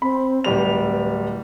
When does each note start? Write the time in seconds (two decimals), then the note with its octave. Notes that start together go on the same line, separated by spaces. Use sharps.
0.02 C4 B5
0.44 D1 G3 B4 F7